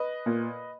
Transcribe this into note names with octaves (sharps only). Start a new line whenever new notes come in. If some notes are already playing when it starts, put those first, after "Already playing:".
Already playing: B4 D#5
A#2